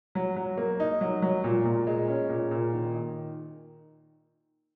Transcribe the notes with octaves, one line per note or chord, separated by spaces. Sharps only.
F#3
F#3
A#3
D#4
F#3
F#3
A#2
A#2
G#3
C#4
A#2
A#2
D#3
D#3